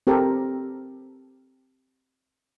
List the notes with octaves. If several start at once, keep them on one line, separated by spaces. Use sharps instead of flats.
C4 G4 A4 A#4